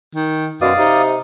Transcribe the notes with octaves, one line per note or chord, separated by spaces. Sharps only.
D#3
F#2 B2 D5 F5 D#6
C3 D#4